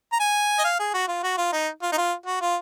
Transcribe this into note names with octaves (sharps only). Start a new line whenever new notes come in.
A#5
G#5
D#5
F5
G#4
F#4
F4
F#4
F4
D#4
F4
D#4
F4
F#4
F4